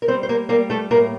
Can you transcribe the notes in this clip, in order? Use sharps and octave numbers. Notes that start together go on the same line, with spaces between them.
A#4
G3 C4 C5
C5
A#3 A#4
G3 A#3 A#4
A3 A4
A2 A#3 A#4